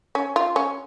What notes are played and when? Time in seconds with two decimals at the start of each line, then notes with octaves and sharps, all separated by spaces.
0.15 C#4
0.36 F4
0.56 C#4